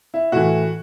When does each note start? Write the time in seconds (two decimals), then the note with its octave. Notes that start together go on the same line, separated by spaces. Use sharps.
0.14 E4
0.32 A2 E3 F#4